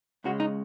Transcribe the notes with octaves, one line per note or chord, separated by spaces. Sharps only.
C#2 C#3 G#3 F#4
D#4